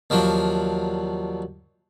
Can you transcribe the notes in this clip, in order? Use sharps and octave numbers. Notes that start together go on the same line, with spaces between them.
D#2 F3 F#3 D4